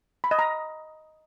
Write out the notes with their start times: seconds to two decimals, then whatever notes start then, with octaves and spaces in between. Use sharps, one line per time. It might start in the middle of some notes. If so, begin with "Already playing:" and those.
0.24 B5
0.31 D#5
0.39 A#5